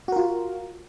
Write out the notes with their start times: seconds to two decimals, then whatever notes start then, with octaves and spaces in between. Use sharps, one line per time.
0.08 F#4
0.12 A#4
0.16 F4